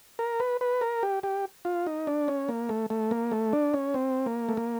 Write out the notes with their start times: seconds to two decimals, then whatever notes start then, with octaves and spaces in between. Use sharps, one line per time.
0.19 A#4
0.40 B4
0.61 B4
0.81 A#4
1.03 G4
1.23 G4
1.65 F4
1.87 D#4
2.07 D4
2.28 C#4
2.49 A#3
2.69 A3
2.90 A3
3.11 A#3
3.31 A3
3.53 D4
3.74 C#4
3.94 C4
4.26 A#3
4.49 A3
4.57 A#3